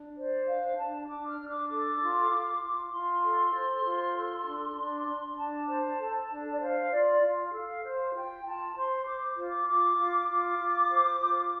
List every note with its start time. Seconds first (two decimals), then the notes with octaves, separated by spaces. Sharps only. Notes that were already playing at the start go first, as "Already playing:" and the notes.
Already playing: D4
0.16 C5 D5
0.46 D4 F5
0.77 D4 A5
1.08 D4 D6
1.29 F6
1.39 D4
1.49 D6
1.69 A4 D6
2.01 F4
2.30 F4
2.62 F4
2.85 D6
2.92 F4 C6
3.23 A4
3.54 C5
3.84 F4
4.15 A4
4.46 D4
4.77 D4
5.07 D4
5.37 D4 A5
5.68 C5
5.99 A4
6.29 D4
6.52 D5
6.60 C5 F5
6.91 F4 D5
7.21 F4 F5
7.52 A4 F5
7.83 C5 F5
8.14 F4 G5
8.44 F4 A5
8.70 A5
8.75 C5 C6
9.05 C5 D6
9.37 F4
9.47 D6
9.67 F4 D6
9.97 F4
10.28 F4 D6
10.59 F4
10.90 C5
11.20 F4
11.40 D6